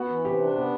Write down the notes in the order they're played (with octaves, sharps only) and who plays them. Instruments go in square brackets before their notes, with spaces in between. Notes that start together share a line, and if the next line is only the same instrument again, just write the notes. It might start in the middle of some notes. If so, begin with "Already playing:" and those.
Already playing: [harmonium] B3 [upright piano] F#4
[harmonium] E3
[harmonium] C3 [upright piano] G4
[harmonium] D4
[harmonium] B3 [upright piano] G4